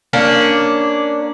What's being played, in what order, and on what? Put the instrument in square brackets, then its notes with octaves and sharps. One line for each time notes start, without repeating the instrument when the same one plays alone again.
[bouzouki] A#3 C#4 D4